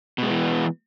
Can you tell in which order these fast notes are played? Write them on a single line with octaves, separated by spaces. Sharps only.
B2 G#3 B3 E3